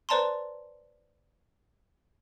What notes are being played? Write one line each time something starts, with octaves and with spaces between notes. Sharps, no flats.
B4 C5 D5 A5 A#5 C6